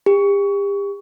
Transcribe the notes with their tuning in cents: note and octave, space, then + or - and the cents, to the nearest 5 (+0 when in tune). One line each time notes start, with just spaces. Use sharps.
G4 +40